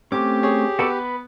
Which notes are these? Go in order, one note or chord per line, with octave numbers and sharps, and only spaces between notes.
A3 C4 C#4 G4 D6
G#4 C#5
B3 F#4 A4 D5
B4